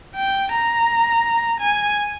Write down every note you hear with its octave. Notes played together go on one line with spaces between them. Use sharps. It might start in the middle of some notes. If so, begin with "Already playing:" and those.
G5
A#5
G#5